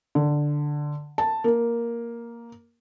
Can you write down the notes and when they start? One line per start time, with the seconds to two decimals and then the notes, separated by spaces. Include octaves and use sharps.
0.15 D3
1.18 A5
1.44 A#3